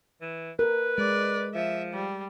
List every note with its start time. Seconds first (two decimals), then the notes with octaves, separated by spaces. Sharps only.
0.22 E3
0.59 A#4 B4
0.98 G#3 D5
1.55 F3 E5
1.93 G3